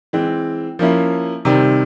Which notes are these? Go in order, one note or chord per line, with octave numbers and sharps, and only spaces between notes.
E3 G#3 C4
F3 A#3 C#4 E4
C3 D#3 G3 C4